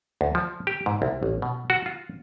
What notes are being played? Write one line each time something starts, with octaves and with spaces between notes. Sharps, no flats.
D2
F3
G4
G#2
C2
A1
B2
F#4
F4